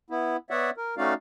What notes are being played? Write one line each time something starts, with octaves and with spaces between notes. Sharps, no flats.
B3 E4
B3 C#5 D5 E5 F#5
A#4
A3 C#4 D#4 F#4 D5 F5